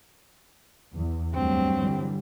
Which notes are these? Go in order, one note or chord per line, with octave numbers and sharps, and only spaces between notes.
E2
D2 G2 F#3 C4
D3 E3 G3